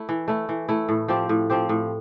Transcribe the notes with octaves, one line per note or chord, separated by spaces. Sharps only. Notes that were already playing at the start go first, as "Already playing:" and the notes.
Already playing: A3 E4
E3
A3 E4
E3
A3 E4
A2
F3 C4 G4
A2
F3 C4 G4
A2